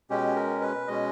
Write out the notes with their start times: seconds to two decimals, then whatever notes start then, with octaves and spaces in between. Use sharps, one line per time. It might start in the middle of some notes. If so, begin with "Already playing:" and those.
0.10 B2 G#3 C#4 G4
0.36 A#4
0.62 B4
0.88 B2 G#3 C#4 D#5